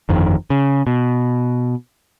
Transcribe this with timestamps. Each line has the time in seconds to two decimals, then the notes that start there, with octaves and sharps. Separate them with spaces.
0.09 G1 F2 D#3
0.50 C#3
0.87 B2